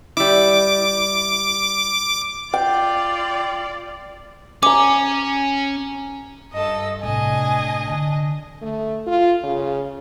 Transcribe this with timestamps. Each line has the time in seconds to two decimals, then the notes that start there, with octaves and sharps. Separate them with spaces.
0.17 G3 E4 D6
2.54 F4 D5 G5
4.63 C#4 G#5 A#5 D6
6.53 G2 A4 D#5 E6
7.03 A2 C3 D4 D#5 G#5
7.89 D3
8.62 A3
9.07 F4
9.43 C#3